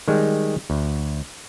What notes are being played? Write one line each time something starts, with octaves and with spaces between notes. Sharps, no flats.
D#3 G3 G#3
D2